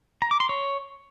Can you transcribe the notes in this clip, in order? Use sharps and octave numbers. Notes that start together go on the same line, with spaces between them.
A#5
D6
C6
C#5